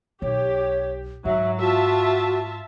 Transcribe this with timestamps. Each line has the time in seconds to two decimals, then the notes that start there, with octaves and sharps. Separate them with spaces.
0.22 B1 G4 C#5
1.25 G#2 F#3 E5
1.60 F4 F#4 E5 A5